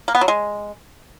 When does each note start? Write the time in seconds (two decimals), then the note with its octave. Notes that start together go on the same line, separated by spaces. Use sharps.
0.08 A#3
0.15 B3
0.21 F#3
0.28 G#3